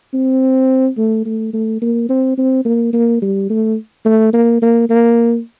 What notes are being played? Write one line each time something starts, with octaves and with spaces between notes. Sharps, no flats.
C4
A3
A3
A3
A#3
C4
C4
A#3
A#3
G3
A3
A3
A#3
A#3
A#3